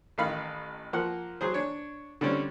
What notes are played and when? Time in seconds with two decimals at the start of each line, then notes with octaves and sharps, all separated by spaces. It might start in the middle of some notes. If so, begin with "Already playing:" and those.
0.18 A1 D#3 D#4 F5 B5
0.93 F3 A#3 F#5
1.41 F#3 G#4 C5
1.54 D4 C#5
2.21 D3 G3 C4 C#4